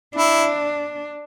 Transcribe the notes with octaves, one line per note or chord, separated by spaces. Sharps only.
D4 E4